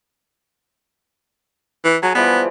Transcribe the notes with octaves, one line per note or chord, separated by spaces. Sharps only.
E3
F#3 G#4
E3 F3 G3 B3